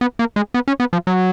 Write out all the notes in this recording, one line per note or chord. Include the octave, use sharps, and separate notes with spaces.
B3
A#3
G#3
B3
C#4
B3
F3
F#3